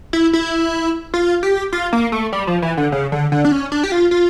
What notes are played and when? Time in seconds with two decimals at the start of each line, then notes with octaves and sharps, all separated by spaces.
0.13 E4
0.33 E4
1.14 F4
1.43 G4
1.73 F4
1.93 A#3
2.12 A3
2.33 G3
2.47 F3
2.62 E3
2.77 D3
2.92 C#3
3.12 D3
3.32 D3
3.45 D4
3.52 C#4
3.72 D4
3.84 G4
3.92 F4
4.11 F4